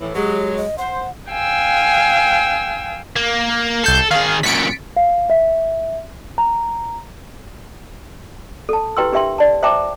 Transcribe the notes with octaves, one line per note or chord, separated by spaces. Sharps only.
A2 E3
F#3 G#3 G4
D#5
C5 F#5
F5 G5 G#5 E6
A#3
C2 A4 G6 C7
D#3 G#4 F5
F#2 A#2 B6 C#7 D7
F5
E5
A#5
A4 A5
E4 G4 B4 G5 C6 E6
D4 G4 A#4 E5 G5 C6
D5 A5
C5 E5 G5 A5 A#5 D6